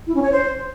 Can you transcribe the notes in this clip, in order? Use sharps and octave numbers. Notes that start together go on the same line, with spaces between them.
E4
C#4
C#5
C5